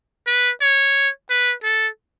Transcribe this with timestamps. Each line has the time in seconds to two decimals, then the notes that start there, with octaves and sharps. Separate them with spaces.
0.27 B4
0.61 C#5
1.30 B4
1.63 A4